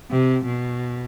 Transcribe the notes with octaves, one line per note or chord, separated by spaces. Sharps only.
C3
B2